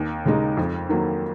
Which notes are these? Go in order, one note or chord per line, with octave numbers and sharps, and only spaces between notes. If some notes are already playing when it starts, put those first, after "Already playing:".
Already playing: D#2
C#3 G#3 D#4
F2
D#3 F#3 A#3